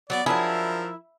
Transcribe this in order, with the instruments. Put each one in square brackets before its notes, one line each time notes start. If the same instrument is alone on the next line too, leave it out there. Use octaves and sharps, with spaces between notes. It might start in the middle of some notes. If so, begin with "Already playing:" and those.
[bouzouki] F#3 A#3 B3 [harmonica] D5
[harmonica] F3 A#4 [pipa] F#3 D4 G#4 [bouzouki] E4